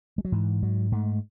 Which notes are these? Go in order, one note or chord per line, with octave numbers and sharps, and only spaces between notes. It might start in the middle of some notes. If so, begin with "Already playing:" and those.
G#3
F#3
G#2 E3
G#2 F#3
G#2 A3